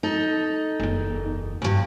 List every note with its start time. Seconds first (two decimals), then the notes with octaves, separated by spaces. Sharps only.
0.03 D#4 A4
0.80 F#1 E2
1.62 D2 G2